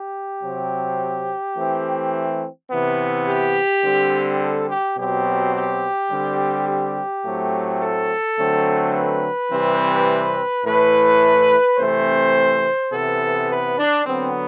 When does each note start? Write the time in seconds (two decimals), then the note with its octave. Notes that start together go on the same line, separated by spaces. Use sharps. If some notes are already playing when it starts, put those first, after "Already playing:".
Already playing: G4
0.43 C3 F#3 C4
1.57 E3 A3 C4
2.70 C3 E3 B3
3.27 G4
3.83 D3 G3 C4
4.40 A4
4.69 G4
4.97 B2 F#3 C4 G4
5.54 G4
6.11 D3 G3 C4
6.68 G4
7.25 A2 F#3 A3 C4
7.81 A4
8.38 D3 F#3 A3 C4
8.94 B4
9.51 C3 E3 G3 C4
10.65 A2 E3 A3 B4
11.78 C3 E3 A3 C4 C5
12.92 C3 E3 B3 A4
13.49 B4
13.78 D4
14.05 D3 F#3 B3 C4